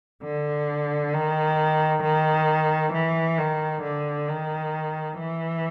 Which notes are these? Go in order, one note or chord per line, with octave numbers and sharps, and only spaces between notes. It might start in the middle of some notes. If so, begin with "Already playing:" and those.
D3
D#3
D#3
E3
D#3
D3
D#3
E3